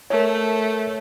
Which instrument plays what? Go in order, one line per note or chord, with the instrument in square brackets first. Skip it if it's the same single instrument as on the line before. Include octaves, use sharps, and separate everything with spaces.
[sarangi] A3 [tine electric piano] A#4 C#5